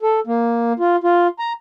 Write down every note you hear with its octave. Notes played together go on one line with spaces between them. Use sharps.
A4
A#3
F4
F4
A#5